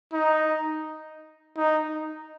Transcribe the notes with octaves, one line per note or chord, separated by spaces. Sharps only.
D#4
D#4